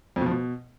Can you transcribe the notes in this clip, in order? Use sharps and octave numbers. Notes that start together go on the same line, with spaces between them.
F2
B2
F3
B2